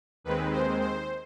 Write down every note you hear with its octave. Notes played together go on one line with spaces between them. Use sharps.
D#2 D#3 G#3 C4 B4
C5
C5